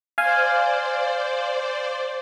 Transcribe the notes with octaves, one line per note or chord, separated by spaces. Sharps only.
C5 D5 F5 G#5